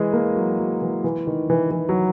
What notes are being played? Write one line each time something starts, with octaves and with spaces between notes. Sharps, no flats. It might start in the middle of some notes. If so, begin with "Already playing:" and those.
Already playing: E3 G#3
A#3
F#3
F#3
E3
E3
D#3
E3
E3
F#3